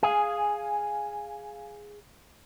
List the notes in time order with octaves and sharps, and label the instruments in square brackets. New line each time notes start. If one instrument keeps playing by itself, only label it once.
[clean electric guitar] G#4 [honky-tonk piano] F5 G#5